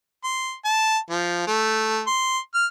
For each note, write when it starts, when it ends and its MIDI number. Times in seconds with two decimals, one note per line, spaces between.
0.24 0.54 84
0.65 0.97 81
1.10 1.45 53
1.47 2.02 57
2.07 2.39 84
2.54 2.66 89